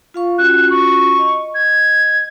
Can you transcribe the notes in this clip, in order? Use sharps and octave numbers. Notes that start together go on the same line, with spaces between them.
F4 F5 C#6
C#4 F4 F#4 F#6
C#6
D#5
G#6